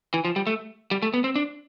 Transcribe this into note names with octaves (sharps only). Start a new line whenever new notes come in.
E3
F3
G3
A3
G3
A3
B3
C4
D4